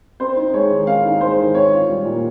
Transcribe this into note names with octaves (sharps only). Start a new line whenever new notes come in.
C4 C5
D#4
G#3 C#5
D#3
C4 F5
D#4
G#3 C5
D#3
C4 C#5
F4
G3
A#2